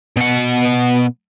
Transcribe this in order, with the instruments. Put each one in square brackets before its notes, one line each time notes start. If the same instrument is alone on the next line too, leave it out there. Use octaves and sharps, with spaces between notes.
[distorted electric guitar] B2 F#5